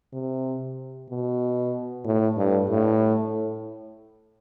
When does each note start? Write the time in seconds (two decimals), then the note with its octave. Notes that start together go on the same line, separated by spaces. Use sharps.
0.13 C3
1.10 B2
2.05 A2
2.38 G2
2.69 A2